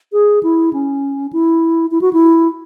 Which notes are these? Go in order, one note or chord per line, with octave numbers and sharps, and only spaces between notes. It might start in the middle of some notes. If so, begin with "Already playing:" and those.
G#4
E4
C#4
E4
E4
F#4
E4